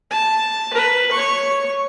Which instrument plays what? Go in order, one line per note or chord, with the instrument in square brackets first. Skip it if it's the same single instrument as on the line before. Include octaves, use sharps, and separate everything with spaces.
[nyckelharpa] A5
B4
C#5 C#6